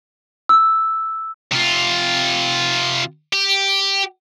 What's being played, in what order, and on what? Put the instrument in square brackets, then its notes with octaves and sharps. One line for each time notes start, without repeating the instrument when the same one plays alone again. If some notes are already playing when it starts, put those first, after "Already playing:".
[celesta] E6
[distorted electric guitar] C3 F4
G4